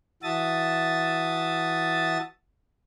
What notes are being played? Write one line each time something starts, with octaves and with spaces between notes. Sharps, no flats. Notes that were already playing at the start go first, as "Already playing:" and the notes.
E3 F#4 E5 A5 D#6 A6